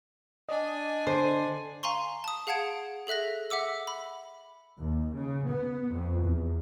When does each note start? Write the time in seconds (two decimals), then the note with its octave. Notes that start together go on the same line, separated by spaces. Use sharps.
0.49 D4 D5 D#5 G#5
1.07 D3 C5
1.83 F5 G#5 A#5 C6 C#6
2.24 A5 D#6
2.47 G#4 F5 F#5 A5 G#6 D7
3.07 G#4 A4 E5 F#6 A#6
3.50 E5 F#5 D6 E6
3.87 B5
4.77 D#2
5.13 C#3
5.48 B3
5.92 F2
6.23 E2